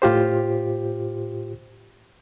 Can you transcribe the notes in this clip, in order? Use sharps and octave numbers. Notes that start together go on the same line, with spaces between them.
A2 F4 G4 C5